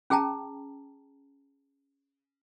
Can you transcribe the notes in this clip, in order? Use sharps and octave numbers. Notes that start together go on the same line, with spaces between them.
C#4 G#4 G5 A5 A#5